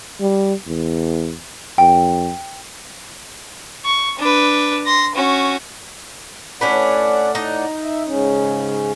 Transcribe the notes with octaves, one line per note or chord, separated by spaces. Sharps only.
G3
E2
F2 G5
C#6
D4 B4
C6 A#6
C#4 F#4
A2 C#4 D4 B4 D5 F#5
D#4
E5
G#2 C#3 C#4